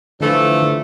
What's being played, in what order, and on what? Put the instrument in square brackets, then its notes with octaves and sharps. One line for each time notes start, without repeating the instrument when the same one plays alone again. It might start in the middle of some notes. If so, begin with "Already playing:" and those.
[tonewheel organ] D3 [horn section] E3 F3 A3